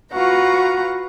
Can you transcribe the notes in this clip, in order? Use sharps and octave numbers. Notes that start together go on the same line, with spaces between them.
F4 F#4 B4 F#5 A#5 C#6